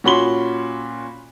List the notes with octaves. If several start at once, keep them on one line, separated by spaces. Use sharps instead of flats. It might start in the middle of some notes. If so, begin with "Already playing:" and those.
A#2 C#4 F#4 B5 C6 G7